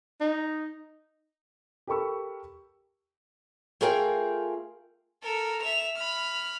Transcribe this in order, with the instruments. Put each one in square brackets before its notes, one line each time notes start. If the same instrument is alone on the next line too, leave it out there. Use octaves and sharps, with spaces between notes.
[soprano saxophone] D#4
[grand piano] G4 A4 A#4 B5 C#6 E6
[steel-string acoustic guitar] A3 F4 G#4 A#4 F5 G5
[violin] A4 A#4
E5 F7
B5 F6